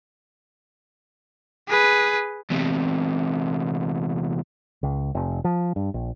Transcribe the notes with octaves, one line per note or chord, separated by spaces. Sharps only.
G#4 B4
E2 C3
C#2
F1
F3
G2
A#1